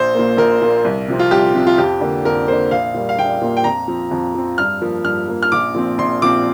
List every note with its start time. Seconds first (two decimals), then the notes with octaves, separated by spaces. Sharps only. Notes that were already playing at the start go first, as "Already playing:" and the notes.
Already playing: A#1 C5
0.15 A#2 A#3
0.37 A#1 A#4
0.61 A#2 A#3
0.85 C2
1.08 C3 F3 C4
1.19 F4
1.31 C2 G4
1.54 C3 F3 C4
1.67 F4
1.78 F2 G4
2.01 D3 A#3
2.25 F2 A#4
2.48 D3 A#3 C5
2.71 A#1 F5
2.94 A#2 G3 A#3
3.09 F5
3.18 A#1 G5
3.41 A#2 G3 A#3
3.57 G5
3.64 F2 A#5
3.88 F3 C4
4.11 F2
4.35 F3 C4
4.58 G2 F6
4.82 F3 A#3
5.04 G2 F6
5.28 F3 A#3
5.43 F6
5.52 A#1 D6
5.74 A#2 F3 C4
5.98 A#1 C6
6.22 A#2 F3 C4 D6